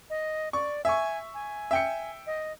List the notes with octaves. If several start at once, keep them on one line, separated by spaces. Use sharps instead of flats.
D#5
D5 C#6
E5 G#5 C#6
G#5
E5 G5 C#7
D#5